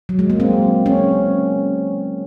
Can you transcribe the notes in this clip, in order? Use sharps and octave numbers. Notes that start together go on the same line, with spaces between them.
F#3
G#3
A#3
C4
C#4